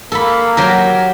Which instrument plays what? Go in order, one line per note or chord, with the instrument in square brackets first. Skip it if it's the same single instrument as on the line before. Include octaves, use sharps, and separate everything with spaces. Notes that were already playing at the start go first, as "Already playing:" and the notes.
[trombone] A#3 [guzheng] A4 B5
[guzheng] F#3 G4 A#4